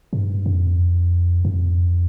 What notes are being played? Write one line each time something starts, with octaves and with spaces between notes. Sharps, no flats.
G2
F2
F2